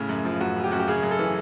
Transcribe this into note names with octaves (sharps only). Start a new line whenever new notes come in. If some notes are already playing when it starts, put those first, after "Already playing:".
Already playing: A2 C#3 E4
F#2
F3
F#2 F#4
C#3
G4
F#2 F#4
G4
C#3 G#4
F#2
A4
E3